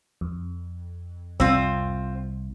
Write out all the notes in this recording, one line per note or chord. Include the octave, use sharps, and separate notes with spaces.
F2
C2 C4 F4